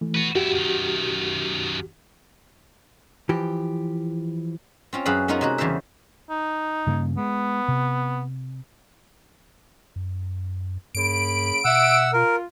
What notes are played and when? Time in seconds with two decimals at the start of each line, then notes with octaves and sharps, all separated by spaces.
0.01 E3 A3
0.15 F#4 B4
0.35 F2 E4 F#4 G4
0.55 F#2 D#3
3.29 E3 F3 G4
4.93 C4 C#4 F4
5.05 F#2 F#4 G#4 B4 F5 B5
5.28 B3 C#4 D#4 F4 G#4 A#4
5.41 C3 G#3 F#4
5.58 E2 C#3 G3 C5 E5
6.29 D#4
6.87 G2 C#3 A#3
7.17 G#3 B3
7.68 C3
9.96 F#2
10.95 G2 C#3 A#3 B5 D7
11.65 B2 E5 F#5 E6
12.13 F4 A#4